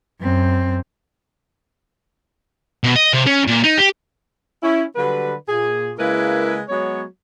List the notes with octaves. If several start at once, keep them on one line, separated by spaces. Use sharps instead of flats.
F#2 C4
B2
D#5
C3
C#4
A#2
D#4
G4
C#4 E4
D3 F#3 G3 B4
A#2 G#4
C#3 G#3 A#3 E4 A#4 B4
F#3 G#3 B3 C#5